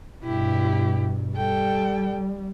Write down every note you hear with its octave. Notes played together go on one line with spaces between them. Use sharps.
G2 B2 E4 G4
G3 A4 G5